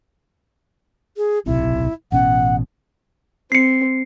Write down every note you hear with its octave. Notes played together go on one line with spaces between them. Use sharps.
G#4
D1 B1 C3 E4
A1 B2 C#4 F#5
C4 C7 C#7